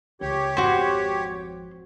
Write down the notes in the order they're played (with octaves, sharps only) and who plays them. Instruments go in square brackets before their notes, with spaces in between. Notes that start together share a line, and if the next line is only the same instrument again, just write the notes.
[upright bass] C#2 [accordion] G4 C#5
[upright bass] G#1 F2 [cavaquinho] F#4 C5